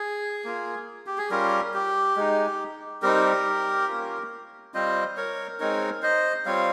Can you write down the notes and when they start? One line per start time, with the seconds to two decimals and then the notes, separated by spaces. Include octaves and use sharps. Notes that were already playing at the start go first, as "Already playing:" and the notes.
Already playing: G#4
0.44 A#3 F4
1.07 G4
1.18 G#4
1.30 G3 C#4 F4 G4 A#4
1.74 G4
2.16 G#3 D#4
3.02 G3 C4 D#4 G4 A#4
3.88 A#3 C#4 F4
4.74 G3 C4 F4 C5 D#5
5.17 A#4 C#5
5.60 G#3 C4 D#4 A#4 C#5
6.02 C5 D#5
6.45 G3 C4 F4 C#5 F5